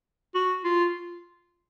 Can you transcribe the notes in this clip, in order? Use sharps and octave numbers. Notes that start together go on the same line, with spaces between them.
F#4
F4